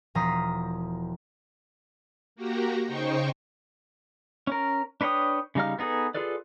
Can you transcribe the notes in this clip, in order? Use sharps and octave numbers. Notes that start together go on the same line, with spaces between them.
E1 F3 A#5 D#6 B6 C7
A#3 F#4 G4 A#5
C#3 D#4 C5 G5 C#6
C#4 A#4
D4 B4 C#5 G5 D#6
C#3 G3 D#4 F5 F6
B3 D#4 G#4 A4 B4
F4 G#4 A4 B4 D5